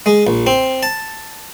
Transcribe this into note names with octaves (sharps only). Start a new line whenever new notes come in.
G#3
A#1
C4
A5